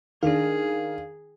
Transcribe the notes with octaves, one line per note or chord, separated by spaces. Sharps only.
D#3 D4 G#4 F5